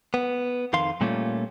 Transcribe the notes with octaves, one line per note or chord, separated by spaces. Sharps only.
B3
F2 D#3 F5 C6
A#2 G3 A3 A#3 C#4 F4